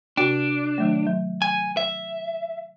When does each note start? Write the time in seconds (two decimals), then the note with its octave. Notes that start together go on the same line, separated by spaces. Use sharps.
0.17 C3 D4 F#4 G5
0.78 D#3 F#3 A3
1.07 F#3
1.42 G#5
1.77 E5